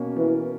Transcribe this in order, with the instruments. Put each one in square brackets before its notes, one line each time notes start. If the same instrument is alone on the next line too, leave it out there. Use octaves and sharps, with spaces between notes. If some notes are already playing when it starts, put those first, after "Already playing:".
Already playing: [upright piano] B2 A#3 C#4
[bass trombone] E3